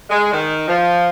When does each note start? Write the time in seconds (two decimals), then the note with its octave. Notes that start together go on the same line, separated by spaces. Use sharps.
0.10 G#3
0.33 D#3
0.68 F3